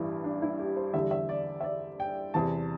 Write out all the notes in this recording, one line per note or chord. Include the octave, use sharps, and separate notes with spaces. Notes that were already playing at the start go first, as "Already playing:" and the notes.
Already playing: A1 G2 E3 G3 E4
D4
E4
G4
C5
E2 D3 G3 E5
E5
D5
E5
D5
G5
E2 C3 E3 A5